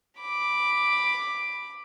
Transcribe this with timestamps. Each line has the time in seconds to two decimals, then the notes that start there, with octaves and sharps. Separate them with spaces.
0.20 B5 D6